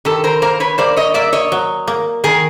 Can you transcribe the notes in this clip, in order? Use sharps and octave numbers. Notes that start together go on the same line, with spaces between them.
D#3 G4 A4
A#4 C5
A#3 A#4 C5
B4 C#5
A#3 C5 D5
C#5 D#5
A#3 D5 E5
C#5 D#5
F#3
A#3
D#3 G#4 A#4